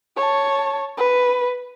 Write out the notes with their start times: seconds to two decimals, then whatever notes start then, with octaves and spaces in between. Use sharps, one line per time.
0.17 C#5 A5
0.98 B4